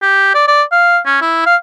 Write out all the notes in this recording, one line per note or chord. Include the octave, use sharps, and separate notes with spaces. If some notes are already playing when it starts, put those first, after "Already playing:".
G4
D5
D5
F5
C#4
E4
F5